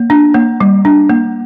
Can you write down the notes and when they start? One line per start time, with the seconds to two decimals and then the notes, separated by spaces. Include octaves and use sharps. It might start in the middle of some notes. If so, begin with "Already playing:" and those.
Already playing: A#3
0.10 D4
0.34 A#3
0.60 G3
0.85 D4
1.10 A#3